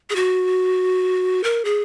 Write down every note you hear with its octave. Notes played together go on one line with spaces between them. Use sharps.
G#4
F#4
A#4
G#4